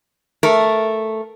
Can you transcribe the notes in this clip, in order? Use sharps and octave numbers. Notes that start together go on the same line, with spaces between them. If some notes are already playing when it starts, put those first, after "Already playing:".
A3 A#4